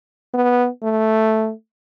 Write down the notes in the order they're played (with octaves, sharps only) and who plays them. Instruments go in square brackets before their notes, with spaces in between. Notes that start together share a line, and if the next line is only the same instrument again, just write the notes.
[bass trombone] B3
A3